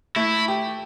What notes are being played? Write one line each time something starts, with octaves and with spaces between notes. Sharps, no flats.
A3 E4
G4